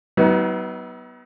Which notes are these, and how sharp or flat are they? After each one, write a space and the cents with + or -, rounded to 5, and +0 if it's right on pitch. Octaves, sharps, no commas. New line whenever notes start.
F#3 +40 B3 -5 D#4 +45